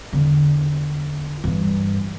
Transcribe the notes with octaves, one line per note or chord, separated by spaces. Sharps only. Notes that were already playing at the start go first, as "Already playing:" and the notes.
E2 D3
G2 E3